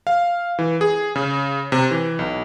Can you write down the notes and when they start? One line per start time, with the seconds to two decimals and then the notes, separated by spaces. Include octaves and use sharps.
0.07 F5
0.59 E3
0.81 G#4
1.16 C#3
1.72 C3
1.91 E3
2.19 B1